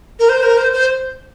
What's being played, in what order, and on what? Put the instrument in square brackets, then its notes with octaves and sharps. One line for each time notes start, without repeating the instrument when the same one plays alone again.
[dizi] A#4
C5
A#4
C5
C5